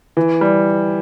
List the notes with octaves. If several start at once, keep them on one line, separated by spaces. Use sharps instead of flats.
E3
G3